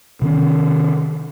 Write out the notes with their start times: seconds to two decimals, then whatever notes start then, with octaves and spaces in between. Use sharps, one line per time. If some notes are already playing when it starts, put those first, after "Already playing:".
0.22 C3 D#3 C#4